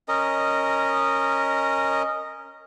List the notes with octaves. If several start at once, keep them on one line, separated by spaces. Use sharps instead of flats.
C#4 A#4 D#5